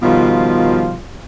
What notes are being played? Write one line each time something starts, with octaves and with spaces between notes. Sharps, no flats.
B2 D#3 F3 G3 F4